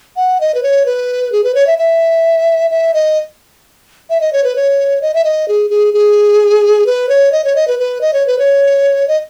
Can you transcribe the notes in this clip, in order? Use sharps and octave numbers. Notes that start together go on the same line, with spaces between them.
F#5
D#5
B4
C#5
B4
G#4
B4
C#5
E5
E5
E5
D#5
E5
D#5
C#5
B4
C#5
D#5
E5
D#5
G#4
G#4
G#4
B4
C#5
D#5
C#5
D#5
B4
B4
D#5
C#5
B4
C#5
D#5